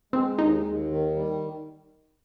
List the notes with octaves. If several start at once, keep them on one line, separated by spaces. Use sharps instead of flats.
G#3 C4
D#2 D#4
D#2
D#3
G3